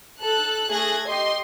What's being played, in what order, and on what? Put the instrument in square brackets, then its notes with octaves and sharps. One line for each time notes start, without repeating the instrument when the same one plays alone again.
[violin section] A4 F#6
A3 G#4 F#6 G#6 A#6
G4 D#5 C6